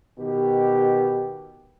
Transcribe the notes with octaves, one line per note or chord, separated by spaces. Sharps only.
B2 D#3 G4